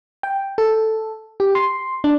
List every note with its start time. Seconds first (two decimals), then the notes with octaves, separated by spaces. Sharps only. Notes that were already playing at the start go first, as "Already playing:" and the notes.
0.23 G5
0.58 A4
1.40 G4
1.55 C6
2.04 D4